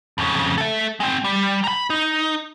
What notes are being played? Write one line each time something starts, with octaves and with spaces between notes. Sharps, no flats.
F2 C#3
A4 E5
G#3 C4
G3
A#5 B5
D#4